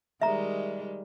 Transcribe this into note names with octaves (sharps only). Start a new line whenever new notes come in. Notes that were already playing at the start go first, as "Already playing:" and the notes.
D#3 G3 G#3 E5 A#5